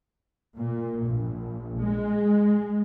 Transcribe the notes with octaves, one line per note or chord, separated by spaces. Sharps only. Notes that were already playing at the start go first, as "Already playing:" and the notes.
A#2
A#1
G#3